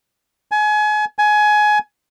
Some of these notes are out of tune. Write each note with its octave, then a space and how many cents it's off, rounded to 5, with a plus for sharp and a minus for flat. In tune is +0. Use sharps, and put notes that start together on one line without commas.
G#5 +30
G#5 +20